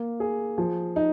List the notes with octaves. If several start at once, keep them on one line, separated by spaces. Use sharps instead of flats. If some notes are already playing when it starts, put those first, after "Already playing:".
Already playing: A#3
G#4
F3
D#4